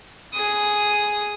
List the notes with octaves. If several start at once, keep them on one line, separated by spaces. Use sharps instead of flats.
G#4 D#6